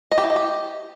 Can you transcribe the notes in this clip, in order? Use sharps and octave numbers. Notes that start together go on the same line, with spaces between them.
D#5
G4
E4
D#5
G4